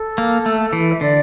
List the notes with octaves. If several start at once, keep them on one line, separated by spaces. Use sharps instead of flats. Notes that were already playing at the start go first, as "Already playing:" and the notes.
Already playing: A4
A#3
A3
E3
E5
D3 D5